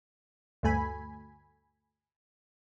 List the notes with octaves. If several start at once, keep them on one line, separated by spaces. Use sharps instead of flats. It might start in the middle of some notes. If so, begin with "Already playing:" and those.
D2 G2 A3 G#5 B5